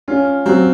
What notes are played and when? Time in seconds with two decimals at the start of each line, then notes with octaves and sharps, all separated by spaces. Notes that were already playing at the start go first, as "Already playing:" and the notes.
0.08 C#4 F4
0.46 F#3 C4